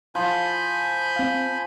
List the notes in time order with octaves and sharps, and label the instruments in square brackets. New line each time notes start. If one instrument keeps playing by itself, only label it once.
[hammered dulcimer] F3 [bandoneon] G#5 B5 G6
[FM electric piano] C4 F5